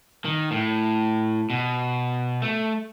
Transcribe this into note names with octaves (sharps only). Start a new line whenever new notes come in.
D#3
A2
B2
A3